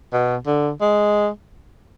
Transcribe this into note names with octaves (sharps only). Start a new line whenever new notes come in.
B2
D3
G#3